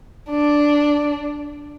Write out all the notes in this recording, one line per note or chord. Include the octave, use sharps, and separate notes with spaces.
D4